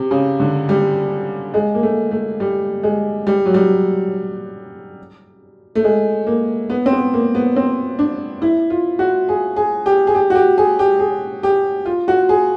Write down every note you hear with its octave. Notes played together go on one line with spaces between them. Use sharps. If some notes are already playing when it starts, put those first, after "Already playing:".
Already playing: C3
C#3
D3
G3
G#3
A#3
A3
A3
G3
G#3
G3
F#3
G3
A3
G#3
A#3
B3
C4
B3
A#3
B3
C4
D4
E4
F4
F#4
G#4
G#4
G4
G#4
G4
F#4
G4
G#4
G4
G#4
G4
F4
F#4
G#4